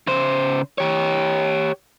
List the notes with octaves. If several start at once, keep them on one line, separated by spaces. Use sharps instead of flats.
C#3 C5
G4 C#5